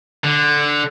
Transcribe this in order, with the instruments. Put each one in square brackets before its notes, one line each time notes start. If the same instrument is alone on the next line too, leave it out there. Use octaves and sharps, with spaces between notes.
[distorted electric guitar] D3